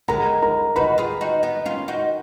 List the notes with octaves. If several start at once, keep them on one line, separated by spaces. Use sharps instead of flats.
G#3 B3 A#4 A#5
A#4 A#5
D#4 F#4 B4 B5
F4 G#4
D#4 F#4
B3 D#4
C#4 F4
D#4 F#4